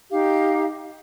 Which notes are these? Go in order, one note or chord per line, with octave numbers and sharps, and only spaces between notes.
D#4 G4 F5